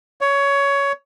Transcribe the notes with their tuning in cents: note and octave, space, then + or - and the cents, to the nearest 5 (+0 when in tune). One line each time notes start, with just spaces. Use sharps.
C#5 +15